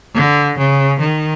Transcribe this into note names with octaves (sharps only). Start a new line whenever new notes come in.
D3
C#3
D#3